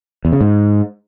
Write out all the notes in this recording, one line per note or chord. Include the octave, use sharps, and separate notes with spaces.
E2
C#3
G#2